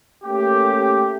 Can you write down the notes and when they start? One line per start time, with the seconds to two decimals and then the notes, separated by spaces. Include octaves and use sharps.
0.23 A3 A#3 C#4 G4